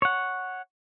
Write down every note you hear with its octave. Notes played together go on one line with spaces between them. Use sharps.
C#5 F#5